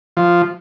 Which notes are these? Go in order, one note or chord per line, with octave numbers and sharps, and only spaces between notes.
F3